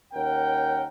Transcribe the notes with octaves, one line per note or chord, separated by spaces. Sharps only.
D#2 C#4 A#4 F#5 G5